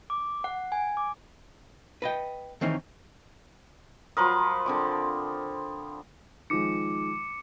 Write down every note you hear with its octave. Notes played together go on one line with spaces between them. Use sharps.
D6
F#5
G#5
D6
B4 D#5 G5
D#3 E3 C4 C#4 D#4
F3 F#3 A#4 B5 C6 D#6
D3 C4 D6
D#3 F3 G#3 D6 C#7